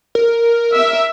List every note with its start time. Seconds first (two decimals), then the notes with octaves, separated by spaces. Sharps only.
0.15 A#4
0.74 E5